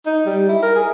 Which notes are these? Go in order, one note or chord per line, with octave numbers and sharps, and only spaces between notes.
D#4
G3
E4
A#4
G#4